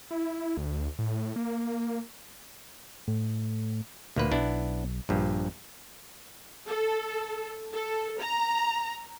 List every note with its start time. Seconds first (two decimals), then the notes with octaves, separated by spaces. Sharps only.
0.11 E4
0.57 D2
0.99 A2
1.36 A#3
3.08 A2
4.16 D2 A#2 A#3 B4
4.31 B1 B3 D4 E4
5.09 A#1 G2 F3
6.67 A4
7.73 A4
8.19 A#5